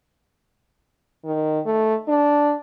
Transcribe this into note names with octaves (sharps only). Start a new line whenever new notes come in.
D#3
A3
D4